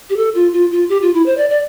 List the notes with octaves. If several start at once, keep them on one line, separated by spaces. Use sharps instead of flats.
G4
A4
F4
F4
F4
G4
F4
E4
C5
D5
D5